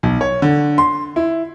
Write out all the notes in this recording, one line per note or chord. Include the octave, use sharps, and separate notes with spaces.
B1
C#5
D3
C6
E4